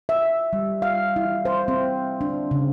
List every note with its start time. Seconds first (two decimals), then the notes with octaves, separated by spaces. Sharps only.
0.09 E5
0.53 G3
0.82 F5
1.16 E4
1.45 C5
1.68 C4
2.21 D4
2.51 C#3